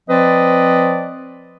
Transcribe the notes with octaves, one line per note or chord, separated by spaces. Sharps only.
F3 C4 B4 D5 D#5